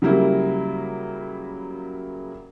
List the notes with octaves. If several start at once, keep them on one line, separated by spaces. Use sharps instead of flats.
C#3 F#3 G3 A#3 E4